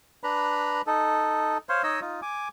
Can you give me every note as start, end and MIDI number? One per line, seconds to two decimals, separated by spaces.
0.24 0.82 62
0.24 0.82 71
0.24 0.82 82
0.24 0.82 83
0.87 1.58 63
0.87 1.58 69
1.69 1.82 72
1.69 1.82 73
1.69 1.82 77
1.69 1.82 84
1.84 2.00 63
1.84 2.00 73
1.84 2.00 75
1.84 2.00 88
2.01 2.20 63
2.01 2.20 65
2.22 2.48 80
2.22 2.48 86